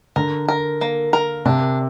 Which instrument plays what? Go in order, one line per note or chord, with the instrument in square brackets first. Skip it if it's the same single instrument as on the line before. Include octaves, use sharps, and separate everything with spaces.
[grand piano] D3 [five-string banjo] A#4
[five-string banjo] A#4
A#3
A#4
[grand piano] C3 [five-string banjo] D4